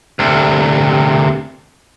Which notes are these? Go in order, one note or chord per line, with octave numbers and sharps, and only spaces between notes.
D2 C3